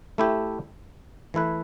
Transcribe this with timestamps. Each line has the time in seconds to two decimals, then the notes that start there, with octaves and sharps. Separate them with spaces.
0.18 A3 E4 G4
1.34 E3 A3 E4 B4